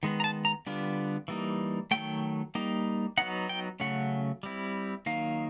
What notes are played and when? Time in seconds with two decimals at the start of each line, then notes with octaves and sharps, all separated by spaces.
0.03 D#3 G#3 B3
0.20 A#5
0.24 A5
0.45 A#5
0.66 D3 G3 B3 D4 F4
1.28 E3 G3 A#3 D#4
1.91 D#3 F#3 A3 G5
2.55 G3 A#3 D#4
3.18 F#3 B3 D#4 F#5
3.49 G5
3.80 C#3 F#3 A3 C#4 F#5
4.43 G3 C4 E4
5.06 D#3 F#3 A#3 D#4 F5